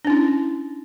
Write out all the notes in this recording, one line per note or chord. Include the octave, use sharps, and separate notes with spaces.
C#4 D4 E4